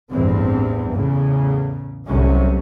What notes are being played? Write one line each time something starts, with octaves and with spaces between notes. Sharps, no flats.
A1 E2 G2 E3 C4
E2 A2 C#3
C2 A2 C3 F#3 C#4